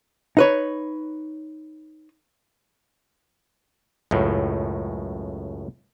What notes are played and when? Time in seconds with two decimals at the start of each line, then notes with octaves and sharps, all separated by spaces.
0.37 D#4 B4 C#5
4.11 C#2 F#2 A2